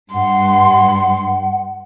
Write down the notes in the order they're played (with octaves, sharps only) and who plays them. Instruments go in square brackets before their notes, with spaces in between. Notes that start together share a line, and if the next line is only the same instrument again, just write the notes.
[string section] G2 [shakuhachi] F#5 [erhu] C6